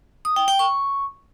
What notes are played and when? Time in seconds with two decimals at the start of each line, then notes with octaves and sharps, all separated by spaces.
0.25 D#6
0.36 G5
0.48 G5
0.59 C#6